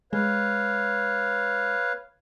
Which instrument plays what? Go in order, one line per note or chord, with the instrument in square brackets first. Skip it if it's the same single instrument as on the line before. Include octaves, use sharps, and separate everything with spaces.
[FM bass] G#3 [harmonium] B4 C#5 F5